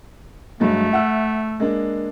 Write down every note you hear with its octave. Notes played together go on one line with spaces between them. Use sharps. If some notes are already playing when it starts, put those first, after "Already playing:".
G2 F#3 G#3 A3
E5 F#5 E6
G#3 A#3 D4